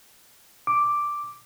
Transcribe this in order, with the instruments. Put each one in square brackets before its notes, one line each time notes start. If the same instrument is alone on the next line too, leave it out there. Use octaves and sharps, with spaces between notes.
[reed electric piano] D6